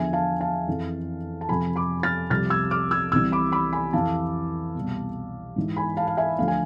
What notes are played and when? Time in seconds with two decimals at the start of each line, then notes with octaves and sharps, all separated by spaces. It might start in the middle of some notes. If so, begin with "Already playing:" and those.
Already playing: E2 D3 F3 E5 G#5
0.13 F5 A5
0.40 F5 A5
0.68 F2 E3
1.41 A5
1.49 F2 C3 F3 G#5 B5
1.76 B5 D6
2.03 F6 A6
2.30 C2 C3 F3 F6 A6
2.50 E6 G#6
2.71 D6 F6
2.91 E6 G#6
3.12 C2 C3 E3 E6 G#6
3.32 B5 D6
3.52 B5 D6
3.73 G#5 B5
3.93 F2 E3 F5 A5
4.75 C2 B2
5.56 G#2 E3
5.76 G#5 B5
5.97 F5 A5
6.07 F5
6.17 E5 G#5
6.38 D2 D3 F3 F5
6.48 G#5